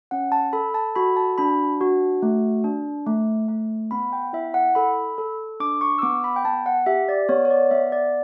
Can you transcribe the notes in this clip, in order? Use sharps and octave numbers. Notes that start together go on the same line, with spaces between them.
C#4 F#5
A5
A4 B5
A5
F#4 B5
A5
D4 B5
F#4
A3
D4
A3
A3
B3 B5
G5
E4 E5
F#5
A4 B5
A4
D4 D6
C#6
E6
B3 D6
B5
G5
B3 A5
F#5
G4 E5
D5
B3 C#5
C#5
D5
B3 E5
D5